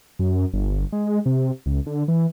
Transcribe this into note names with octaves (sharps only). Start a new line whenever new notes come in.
F#2
G1
G#3
C3
C#2
D3
E3